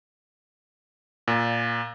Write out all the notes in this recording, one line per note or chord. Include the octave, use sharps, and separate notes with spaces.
A#2